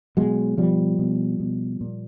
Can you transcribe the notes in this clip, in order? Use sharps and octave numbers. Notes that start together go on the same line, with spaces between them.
B2 F#3 G#3
B2 F3 G3
B2
B2
A#2